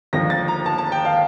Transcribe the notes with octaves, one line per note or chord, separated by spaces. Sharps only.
D#2 D3 F3 A#6
A6
A#5
A5
A5
G5
F5